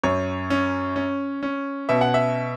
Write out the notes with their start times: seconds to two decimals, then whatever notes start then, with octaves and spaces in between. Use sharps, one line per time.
0.03 F#2 C#5
0.50 C#4
0.96 C#4
1.43 C#4
1.89 B2 E5
2.01 F#5
2.14 E5